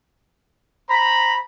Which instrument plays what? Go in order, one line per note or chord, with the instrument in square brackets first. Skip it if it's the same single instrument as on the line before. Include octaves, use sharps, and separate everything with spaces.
[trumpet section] C5 A#5 B5